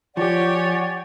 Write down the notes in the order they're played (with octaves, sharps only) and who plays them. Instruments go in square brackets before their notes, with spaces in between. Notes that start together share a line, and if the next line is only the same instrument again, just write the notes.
[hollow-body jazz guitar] F3 [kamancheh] G4 C#5 [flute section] D5 F#5 G#5